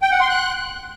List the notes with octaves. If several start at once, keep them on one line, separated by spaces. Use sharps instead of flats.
G5
F#5
C6
F#6